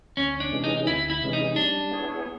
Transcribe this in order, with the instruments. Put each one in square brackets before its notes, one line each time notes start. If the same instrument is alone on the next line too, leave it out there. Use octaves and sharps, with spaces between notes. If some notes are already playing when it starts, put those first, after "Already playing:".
[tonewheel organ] D2 [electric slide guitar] C#4
[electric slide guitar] D4
[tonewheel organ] C3 E3 G#3 C#4
[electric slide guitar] D#4
[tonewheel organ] D2 [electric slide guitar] E4
[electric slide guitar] E4
[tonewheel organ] C3 E3 G#3 C#4
[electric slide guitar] D#4
[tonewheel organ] G3 [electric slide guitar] D4
[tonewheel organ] B3 E4 G#4 C#5